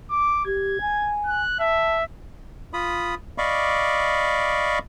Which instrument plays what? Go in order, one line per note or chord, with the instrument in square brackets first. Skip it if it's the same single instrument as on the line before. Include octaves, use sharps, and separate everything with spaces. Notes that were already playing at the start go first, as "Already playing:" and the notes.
[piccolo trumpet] D6
[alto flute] G4 [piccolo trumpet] G#6
[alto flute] G#5
[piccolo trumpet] F#6
[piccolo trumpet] E5 [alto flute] A5
[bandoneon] F4 B5 D#6
D5 D#5 F5 B5 C#6 D6